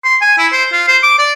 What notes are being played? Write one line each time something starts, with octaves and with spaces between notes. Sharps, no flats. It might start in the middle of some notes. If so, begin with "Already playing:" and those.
C6
G#5
E4
C5
F4
C5
D6
D5